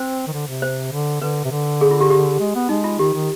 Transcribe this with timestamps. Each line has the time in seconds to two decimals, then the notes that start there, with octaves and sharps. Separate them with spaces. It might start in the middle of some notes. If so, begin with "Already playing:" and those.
Already playing: C4 C5
0.27 D#3
0.33 D3
0.47 C3
0.62 C5
0.92 D3
1.21 D3 B4
1.45 C3
1.51 D3
1.81 G#4
1.91 F4
2.01 G4
2.11 G4
2.40 G#3
2.55 B3
2.69 G#3 D#4
2.84 F4
2.99 D#3 G4
3.14 D#3